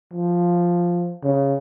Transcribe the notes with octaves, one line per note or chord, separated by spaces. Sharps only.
F3
C#3